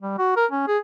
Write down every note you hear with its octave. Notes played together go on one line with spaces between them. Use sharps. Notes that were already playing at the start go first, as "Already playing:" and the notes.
G3
F#4
A#4
C#4
G#4